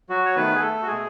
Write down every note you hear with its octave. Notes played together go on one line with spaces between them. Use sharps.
F#3 F#4
C#5
D#3 A3 B3 B4
G#4
A3 A4
F#4
B2 G#3 A3 G#4